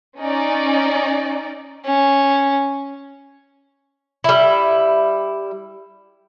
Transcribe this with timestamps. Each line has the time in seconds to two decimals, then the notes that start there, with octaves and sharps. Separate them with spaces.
0.19 C#4 D#4 D5
1.85 C#4
4.24 G3 E4